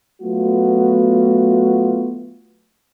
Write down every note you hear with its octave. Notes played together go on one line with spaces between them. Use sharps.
F#3 A3 B3 F4 F#4